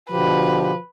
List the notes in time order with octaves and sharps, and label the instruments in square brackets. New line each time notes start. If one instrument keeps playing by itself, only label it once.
[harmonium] B2 D3 G4 [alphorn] F3 [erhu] B4